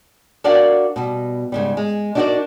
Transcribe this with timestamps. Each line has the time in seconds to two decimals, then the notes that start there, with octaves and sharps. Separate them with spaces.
0.44 D4 F#4 A#4 D5 F5 F#5
0.96 B2 G3
1.52 G#2 C#3 G3
1.77 G#3
2.15 D4 D#4 F#4 G4 A#4 D5